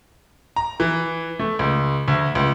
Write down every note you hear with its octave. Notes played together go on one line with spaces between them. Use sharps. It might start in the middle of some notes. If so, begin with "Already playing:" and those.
A#5
E3
A3
C#2
D2
C#2